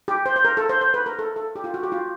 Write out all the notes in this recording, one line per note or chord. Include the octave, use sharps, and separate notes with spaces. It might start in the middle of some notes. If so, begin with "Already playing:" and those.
G4
C5
C5
A#4
A4
C5
C5
B4
A#4
A4
A4
G4
F4
F#4
G4
F4